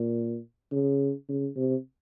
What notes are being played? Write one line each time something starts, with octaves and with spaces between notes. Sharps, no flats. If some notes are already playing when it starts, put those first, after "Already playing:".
Already playing: A#2
C#3
C#3
C3